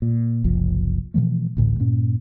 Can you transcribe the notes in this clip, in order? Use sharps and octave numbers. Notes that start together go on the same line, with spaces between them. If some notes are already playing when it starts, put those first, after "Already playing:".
A#2
F#1 C2 F3
B2 E3 F3 A3
A1 D2 A2
G2 A#2 C#4